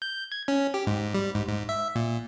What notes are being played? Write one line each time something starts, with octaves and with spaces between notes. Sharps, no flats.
G6
G#6
C#4
G4
G#2
G3
G#2
G#2
E5
A#2